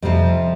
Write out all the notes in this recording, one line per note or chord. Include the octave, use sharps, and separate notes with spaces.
F2 C3 F3 G3